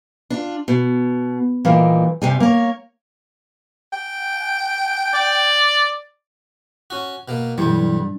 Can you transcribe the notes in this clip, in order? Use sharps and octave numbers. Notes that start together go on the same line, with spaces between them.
D4 F4
B2
G2 A#2 D#3 E3 A#4 F5
G2 C3 G3 G#5
A#3 A#4 C#5
G5
D5
C#4 F#4
B2 A#3
B1 G2 E3 G3